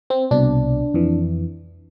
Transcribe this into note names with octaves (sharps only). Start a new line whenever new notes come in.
C4
C2 B2 D4
F2 E3